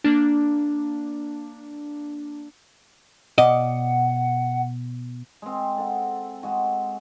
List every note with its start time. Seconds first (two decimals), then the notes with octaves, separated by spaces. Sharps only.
0.04 A#3 D4
3.38 B2 D5 D#5 F#5
5.42 G#3 C4
5.78 A4 F#5
6.43 G#3 F#4